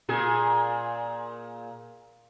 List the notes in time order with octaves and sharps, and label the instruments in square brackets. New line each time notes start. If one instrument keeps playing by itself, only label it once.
[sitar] A#2 G#4